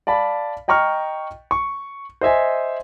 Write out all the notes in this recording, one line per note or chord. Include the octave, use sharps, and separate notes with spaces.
D5 F5 A5 B5
D#5 G5 A#5 C#6 F6
C#6
C5 D#5 E5 G#5